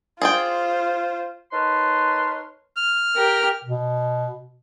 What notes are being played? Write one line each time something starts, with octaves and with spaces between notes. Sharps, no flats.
F4 G#4 C5 D5 G5
D#4 A#4 B4 C#5 A5 C6
F6
G4 A#4
B2